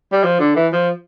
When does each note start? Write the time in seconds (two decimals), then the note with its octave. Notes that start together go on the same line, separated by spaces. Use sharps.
0.13 G3
0.24 F3
0.40 D3
0.56 E3
0.73 F3